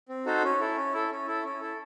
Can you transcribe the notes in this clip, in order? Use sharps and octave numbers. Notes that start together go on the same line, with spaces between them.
C4
D#4 F#4 A4 C5
C#4
E4 A4
C#4
E4 A4
C#4
E4 A4
C#4
E4 A4